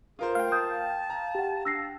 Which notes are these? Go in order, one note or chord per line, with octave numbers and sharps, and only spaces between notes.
F4 G#4 A#4 C5
A3 F5 G5
A5 D#6 G6
A#5
G4 F#5
D4 E6 A#6 C7